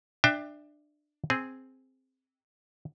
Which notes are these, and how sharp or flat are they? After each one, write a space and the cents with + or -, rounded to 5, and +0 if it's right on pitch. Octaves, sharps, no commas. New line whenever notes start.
D4 +20 E5 +0 G5 +25
C4 +0 G#4 +0